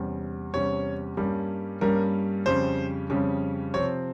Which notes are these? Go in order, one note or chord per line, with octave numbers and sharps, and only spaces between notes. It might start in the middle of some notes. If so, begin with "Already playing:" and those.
Already playing: E2 C3 G3 C#4
E2 C3 G3 C#4 C#5
G2 G3 A#3 C#4
G2 G3 A#3 C#4 A#4
F2 C#3 G3 C#4 C5
F2 C#3 G3 C#4
C3 F3 C4 C#5